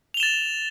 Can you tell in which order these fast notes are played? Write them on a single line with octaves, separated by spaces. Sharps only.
F7 G7 E7 A6